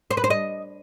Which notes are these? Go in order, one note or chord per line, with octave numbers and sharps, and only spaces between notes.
C5
B4
C5
D#5